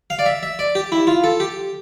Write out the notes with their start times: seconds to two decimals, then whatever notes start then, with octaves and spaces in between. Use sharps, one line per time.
0.10 F5
0.19 D5
0.26 E5
0.43 E5
0.59 D5
0.75 G4
0.92 E4
1.07 F4
1.24 A4
1.40 G4